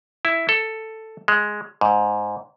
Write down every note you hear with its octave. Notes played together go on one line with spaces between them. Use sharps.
E4
A4
G#3
G#2